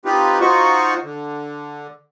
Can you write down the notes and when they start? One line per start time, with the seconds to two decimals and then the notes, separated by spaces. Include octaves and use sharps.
0.05 C4 D#4 F4 G4 B4
0.41 D#4 F4 F#4 C5 C#6
1.03 D3